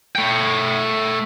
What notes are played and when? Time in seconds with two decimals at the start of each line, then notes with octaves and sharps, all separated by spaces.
0.16 A3 G5